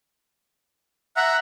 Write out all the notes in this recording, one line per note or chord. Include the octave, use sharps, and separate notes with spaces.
E5 F#5 A#5 F#6